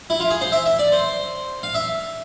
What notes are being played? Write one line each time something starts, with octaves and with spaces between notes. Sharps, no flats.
E4
F4
G#4
C5
E5
E5
D5
C5
F5
E5